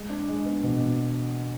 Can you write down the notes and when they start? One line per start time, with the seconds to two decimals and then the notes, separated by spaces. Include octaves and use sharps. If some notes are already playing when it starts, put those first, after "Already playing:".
Already playing: G#3
0.10 D4
0.28 G#3
0.45 B3
0.63 B2
0.81 B2